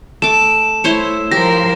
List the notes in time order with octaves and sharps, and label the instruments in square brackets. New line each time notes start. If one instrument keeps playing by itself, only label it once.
[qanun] A3 D6 [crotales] E7
[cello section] A3 [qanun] E4 C5 C#5
[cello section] F3 A#4 C5 [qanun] G4 [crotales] A#6